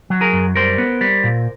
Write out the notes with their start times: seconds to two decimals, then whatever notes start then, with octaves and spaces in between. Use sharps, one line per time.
0.10 F#3
0.21 G#4 A#4
0.33 F#2
0.56 G3 A#4 C5
0.78 B3
1.01 G3
1.24 A#2